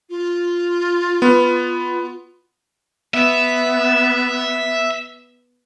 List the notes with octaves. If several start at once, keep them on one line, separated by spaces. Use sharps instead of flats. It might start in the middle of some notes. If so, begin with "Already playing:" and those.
F4
B3
B3 E5